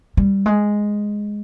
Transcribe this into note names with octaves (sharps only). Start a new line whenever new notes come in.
G3
G#3